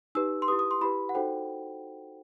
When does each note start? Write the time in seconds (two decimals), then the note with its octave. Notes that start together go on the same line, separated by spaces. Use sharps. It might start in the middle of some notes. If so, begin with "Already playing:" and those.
0.15 D#4 G4 B4 E6
0.42 C6
0.48 E4 G4 B4 D#6
0.59 D#6
0.71 C6
0.81 E4 G4 B4 B5
1.09 F#5
1.15 D#4 F#4 A4 C5 G5